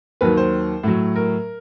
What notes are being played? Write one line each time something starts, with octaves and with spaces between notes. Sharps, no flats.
D#2 D#3 F#3 B4
C5
A2 F#3
A#4